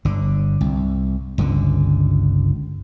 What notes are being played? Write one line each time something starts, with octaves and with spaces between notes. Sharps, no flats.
G1 D3
C2
G1 C#2 D3